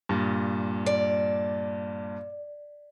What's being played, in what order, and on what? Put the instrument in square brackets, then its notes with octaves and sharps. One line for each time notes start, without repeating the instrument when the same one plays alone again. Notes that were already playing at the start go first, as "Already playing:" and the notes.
[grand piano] G2 A#2
[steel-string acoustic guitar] D5